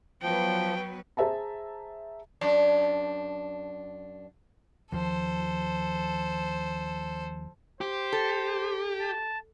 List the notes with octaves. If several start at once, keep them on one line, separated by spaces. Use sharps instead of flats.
F3 F#3 B3 B4 G5
G#4 C5 E5 A5 A#5
F#2 D4
D#2 F3 A4 C5
G4 C5
A4
A5